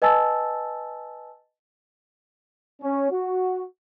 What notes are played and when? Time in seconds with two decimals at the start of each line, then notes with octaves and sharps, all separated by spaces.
0.02 B4 D#5 G#5 A5 E6 A6
2.82 C#4
3.11 F#4